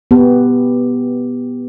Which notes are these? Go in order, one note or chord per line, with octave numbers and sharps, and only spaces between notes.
B3 G4